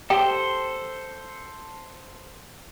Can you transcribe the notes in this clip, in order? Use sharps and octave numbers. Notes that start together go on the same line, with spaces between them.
G4 A4 C5